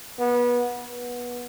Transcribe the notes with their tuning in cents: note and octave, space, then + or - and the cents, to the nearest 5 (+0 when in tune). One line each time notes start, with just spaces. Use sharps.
B3 -25
B3 -20